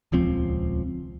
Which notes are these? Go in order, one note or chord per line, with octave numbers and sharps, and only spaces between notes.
D#1 C#2 F3 C4